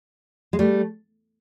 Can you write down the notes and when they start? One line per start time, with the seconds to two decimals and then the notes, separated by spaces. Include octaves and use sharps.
0.53 G#3
0.59 G3 A3